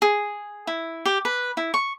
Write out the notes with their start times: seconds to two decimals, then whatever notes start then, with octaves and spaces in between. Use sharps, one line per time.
0.02 G#4
0.67 E4
1.05 G4
1.25 B4
1.57 E4
1.74 C#6